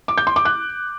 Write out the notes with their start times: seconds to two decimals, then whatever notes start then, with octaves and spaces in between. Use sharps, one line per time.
0.08 D6
0.18 G6
0.27 C6
0.36 D6
0.45 F#6